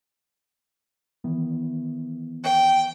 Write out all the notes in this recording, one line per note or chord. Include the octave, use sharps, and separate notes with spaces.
D#3 E3 B3
G5